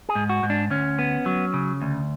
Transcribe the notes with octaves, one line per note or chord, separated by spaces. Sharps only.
G#4
G#2
F#4
G#2
D4
D2 C#4
B3
F#3
C#3
D2